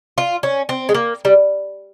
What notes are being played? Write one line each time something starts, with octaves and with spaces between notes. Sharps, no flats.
F4
C#4
C4
G#3
A#3
G3